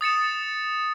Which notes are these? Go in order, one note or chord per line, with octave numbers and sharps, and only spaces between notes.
D#6 A6 C#7 E7